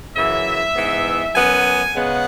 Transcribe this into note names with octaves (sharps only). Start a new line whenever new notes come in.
F#2 C#3 E3 E5
G#2 E3 B3
F#2 F#3 B3 G#5
C#3 G#3 B3 F#5